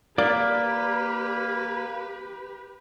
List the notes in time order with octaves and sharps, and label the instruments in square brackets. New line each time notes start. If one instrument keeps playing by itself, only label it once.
[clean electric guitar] A#3 [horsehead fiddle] G4 B4 [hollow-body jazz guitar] D5